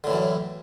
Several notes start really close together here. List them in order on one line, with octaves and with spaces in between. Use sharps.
D3 A2 E3 F#2